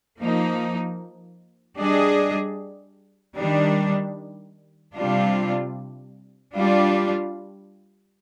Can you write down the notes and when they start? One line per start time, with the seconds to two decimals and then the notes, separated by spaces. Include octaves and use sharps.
0.19 F3 A#3 D#4
1.78 G3 D4 G#4 D#5
3.36 D#3 G3 D4
4.95 C3 G3 D4 F4
6.54 G3 D4 F4